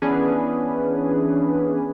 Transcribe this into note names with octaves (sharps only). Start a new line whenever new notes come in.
E3 B3 C#4 D4 G#4 B4